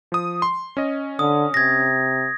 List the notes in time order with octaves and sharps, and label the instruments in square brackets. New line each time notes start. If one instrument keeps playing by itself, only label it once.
[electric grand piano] F3 D#6
C6
C#4 D#5
[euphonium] D3 [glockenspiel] D#6
[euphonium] C3 [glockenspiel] G#6 A#6